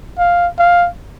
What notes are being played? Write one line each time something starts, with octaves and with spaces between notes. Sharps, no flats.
F5
F5